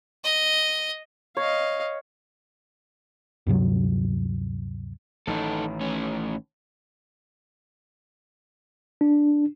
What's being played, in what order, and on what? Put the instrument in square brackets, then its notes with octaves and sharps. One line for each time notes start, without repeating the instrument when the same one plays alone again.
[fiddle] D#5
[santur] C#5 [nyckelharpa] D#5 F5
[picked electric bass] D2 G2 C3 F#3
[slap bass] A1 D#3 [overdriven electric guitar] D#4 A4
[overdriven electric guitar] A2 C#4
[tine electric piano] D4